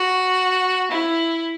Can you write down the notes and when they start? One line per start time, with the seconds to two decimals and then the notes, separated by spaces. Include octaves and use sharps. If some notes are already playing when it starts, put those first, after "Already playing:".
Already playing: F#4
0.92 E4